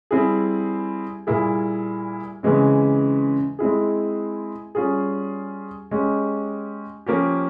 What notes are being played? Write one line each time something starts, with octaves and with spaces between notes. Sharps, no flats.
G3 C4 E4 G#4
A#2 G3 A#3 E4 G#4
C#3 E3 G#3 C4
G#3 C4 E4 G#4
G3 C#4 F4 G#4
G#3 C#4 G4
F3 A#3 C#4 G4